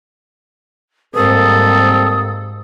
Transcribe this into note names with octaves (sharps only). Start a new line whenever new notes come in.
G#2 G3 A#3 C4 A4 D#6